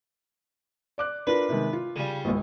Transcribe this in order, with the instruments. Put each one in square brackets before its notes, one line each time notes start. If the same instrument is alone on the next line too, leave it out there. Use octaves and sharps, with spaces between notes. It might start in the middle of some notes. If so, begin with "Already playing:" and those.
[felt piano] D5 D6 F#6
[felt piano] D4 F4 A#4 [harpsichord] B4
[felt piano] C3 D#3 G#3
F4
[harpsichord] C#3 G3
[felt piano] G#1 C#2